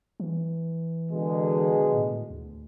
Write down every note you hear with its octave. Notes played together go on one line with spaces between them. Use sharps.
E3
B2 D3 G#3
A2
D2